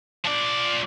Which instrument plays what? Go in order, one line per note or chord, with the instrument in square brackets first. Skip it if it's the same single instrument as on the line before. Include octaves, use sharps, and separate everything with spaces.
[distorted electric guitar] F3 D5